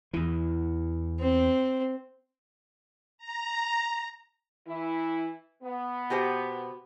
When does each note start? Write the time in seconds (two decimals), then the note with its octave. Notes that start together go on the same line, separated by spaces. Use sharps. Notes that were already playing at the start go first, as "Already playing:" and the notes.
0.13 E2 E3
1.20 C4
3.18 A#5
4.68 E3 E4
5.63 B3
6.10 B2 G4 C5